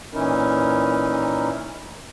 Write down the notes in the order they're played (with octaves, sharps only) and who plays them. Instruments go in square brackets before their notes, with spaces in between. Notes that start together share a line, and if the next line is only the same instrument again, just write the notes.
[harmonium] A#2 E3 C#4 D#4 E4 A#4